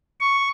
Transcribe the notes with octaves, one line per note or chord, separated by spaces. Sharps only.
C#6